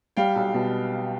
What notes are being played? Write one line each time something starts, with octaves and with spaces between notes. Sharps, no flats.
G3 F5 G5
B1
B2